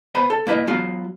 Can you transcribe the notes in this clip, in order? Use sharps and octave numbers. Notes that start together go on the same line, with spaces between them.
B3 C5 B5
A4
A#3 E4 B4 D#5
F#3 B3 F4 F#4